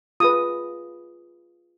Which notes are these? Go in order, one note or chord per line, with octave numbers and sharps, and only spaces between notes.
F4 G#4 B4 D#6